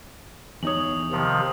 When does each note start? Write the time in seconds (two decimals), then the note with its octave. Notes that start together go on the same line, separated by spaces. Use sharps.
0.63 E2 D#4 C#5 D#6 F#7
1.12 C3 D#3 F3